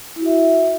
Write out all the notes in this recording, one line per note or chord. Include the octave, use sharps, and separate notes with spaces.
E4 F#4 E5